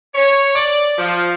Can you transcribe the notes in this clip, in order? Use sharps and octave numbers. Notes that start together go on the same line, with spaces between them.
C#5
D5
F3